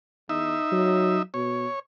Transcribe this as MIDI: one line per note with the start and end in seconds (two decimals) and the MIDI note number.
0.29 0.56 40
0.29 1.22 63
0.29 1.22 76
0.72 1.20 54
1.34 1.66 47
1.34 1.79 73